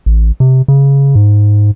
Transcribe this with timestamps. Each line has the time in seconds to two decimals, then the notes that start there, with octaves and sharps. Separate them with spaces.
0.06 A1
0.40 C3
0.68 C#3
1.15 G#2